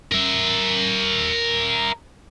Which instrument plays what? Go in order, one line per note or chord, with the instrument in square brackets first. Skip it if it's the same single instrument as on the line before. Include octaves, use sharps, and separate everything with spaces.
[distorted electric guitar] A#4 E5